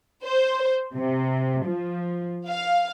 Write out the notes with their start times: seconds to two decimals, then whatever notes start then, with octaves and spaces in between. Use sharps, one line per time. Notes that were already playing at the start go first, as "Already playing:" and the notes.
0.24 C5
0.94 C3
1.64 F3
2.46 F5